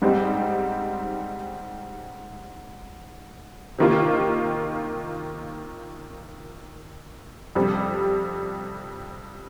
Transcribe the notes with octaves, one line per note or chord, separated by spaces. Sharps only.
G#2 G3 C4 D#4
C3 D#3 A#3 F4
F2 C3 G3